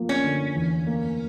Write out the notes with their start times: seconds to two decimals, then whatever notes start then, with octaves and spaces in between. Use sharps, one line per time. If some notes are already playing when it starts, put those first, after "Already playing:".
Already playing: F3 A#3
0.09 C#4
0.24 D3
0.55 E2
0.87 A#3